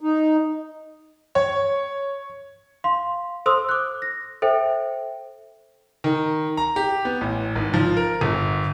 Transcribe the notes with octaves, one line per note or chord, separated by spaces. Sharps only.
D#4
C#5
F5 C6
A4 C5 C6 D#6 E6
D6 F#6
A#6
A4 C5 E5 G5
D#3
A#5
G4
B3
A1
G#1
F3
A#4
G1